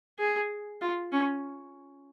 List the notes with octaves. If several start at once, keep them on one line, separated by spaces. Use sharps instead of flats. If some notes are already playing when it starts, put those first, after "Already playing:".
G#4
F4
C#4